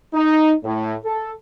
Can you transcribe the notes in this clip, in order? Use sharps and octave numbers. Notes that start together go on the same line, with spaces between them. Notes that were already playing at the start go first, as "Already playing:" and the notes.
D#4
A2
A4